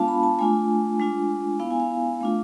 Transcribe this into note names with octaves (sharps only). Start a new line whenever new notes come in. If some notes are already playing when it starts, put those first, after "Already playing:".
Already playing: G#3 B3 D4 F4 F5 A5
B5
A5
A3 D4 F4 G#5
G#3 D4 F4
B3 E4 F5
G#5
F5
A3 D4 F4